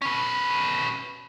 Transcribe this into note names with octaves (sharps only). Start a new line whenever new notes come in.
C#4 B4